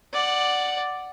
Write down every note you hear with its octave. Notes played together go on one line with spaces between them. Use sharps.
D5 F#5